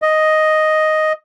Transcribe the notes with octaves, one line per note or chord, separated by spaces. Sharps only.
D#5